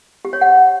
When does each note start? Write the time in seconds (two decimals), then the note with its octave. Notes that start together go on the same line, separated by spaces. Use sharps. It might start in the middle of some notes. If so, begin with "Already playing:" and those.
0.25 G4
0.33 C#5
0.41 F#5